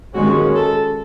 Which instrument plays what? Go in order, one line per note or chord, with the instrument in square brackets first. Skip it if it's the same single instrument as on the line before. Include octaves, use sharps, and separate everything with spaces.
[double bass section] D#2 D#3 G#3 C#4 [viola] F#4
[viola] A4